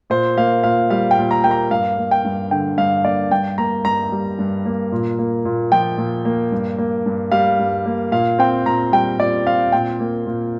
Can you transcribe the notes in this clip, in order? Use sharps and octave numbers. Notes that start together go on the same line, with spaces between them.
A#2 C5
A#3 F5
A#2 F5
G3 F5
G5
A#2
A#5
A#3 G5
A#5
G2 F5
A#3
G5
G2
D3 G5
G2 F5
A#3 D5
G2 G5
A#3 A#5
G2 A#5
G3
G2
A#3
A#2
A#3
A#2
F3 G5
A#2
A#3
G2
A#3
G2
G3 F5
G2
A#3
A#2 F5
C4 G5
A#2 A#5
G3 G5
A#2 D5
C4 F5
A#2 G5
A#3
A#2